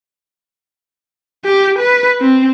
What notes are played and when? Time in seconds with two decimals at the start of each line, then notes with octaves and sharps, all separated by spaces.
1.45 G4
1.79 B4
2.21 C4